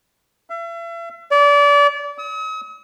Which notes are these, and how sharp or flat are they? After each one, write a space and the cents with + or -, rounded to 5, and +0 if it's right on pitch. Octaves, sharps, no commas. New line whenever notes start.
E5 +40
D5 -30
D#6 +45